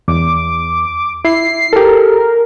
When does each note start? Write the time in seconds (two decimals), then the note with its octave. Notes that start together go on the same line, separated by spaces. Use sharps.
0.08 E2 D6
1.25 E4 C7
1.73 G4 A4 A#4